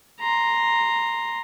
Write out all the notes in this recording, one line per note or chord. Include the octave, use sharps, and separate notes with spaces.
A#5 C6